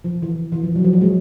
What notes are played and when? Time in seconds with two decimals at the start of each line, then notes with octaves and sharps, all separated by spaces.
0.04 F3
0.22 E3
0.52 E3
0.64 F3
0.75 F#3
0.84 F3
0.93 F#3
1.01 G#3